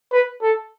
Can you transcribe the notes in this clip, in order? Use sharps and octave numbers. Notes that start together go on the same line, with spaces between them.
B4
A4